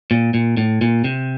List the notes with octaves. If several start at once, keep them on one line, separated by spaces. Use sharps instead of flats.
A#2
A#2
A2
A#2
C3